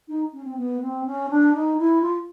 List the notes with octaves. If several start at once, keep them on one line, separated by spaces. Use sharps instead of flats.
D#4
C#4
C4
B3
C4
C#4
D4
D#4
E4
F4